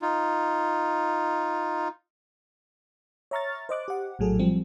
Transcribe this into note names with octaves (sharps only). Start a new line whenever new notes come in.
D#4 F4
C#5 E5 A#5 C#6 F6 A6
C5 D#5 D6 F#6
G4 F#5
A#1 A2 F#3 G#4 A4
F3 G3 C4